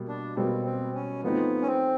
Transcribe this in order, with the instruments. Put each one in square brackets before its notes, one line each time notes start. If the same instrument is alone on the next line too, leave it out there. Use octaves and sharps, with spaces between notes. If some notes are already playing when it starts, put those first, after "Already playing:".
Already playing: [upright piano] B2 G3 A#3
[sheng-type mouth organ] D4
[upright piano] B2 G3 A#3 [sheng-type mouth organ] C4
[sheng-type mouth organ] C4
C#4
[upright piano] F3 A3 C4 D#4 [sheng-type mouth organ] B3
[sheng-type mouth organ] C#4
C4